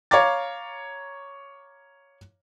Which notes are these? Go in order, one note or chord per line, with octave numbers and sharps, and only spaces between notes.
C#5 F5 A#5 D6 A6